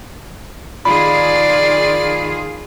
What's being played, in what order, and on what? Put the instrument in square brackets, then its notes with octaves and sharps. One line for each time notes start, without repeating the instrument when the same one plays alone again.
[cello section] D#3 F4 G#4 [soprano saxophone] D5 [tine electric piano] B5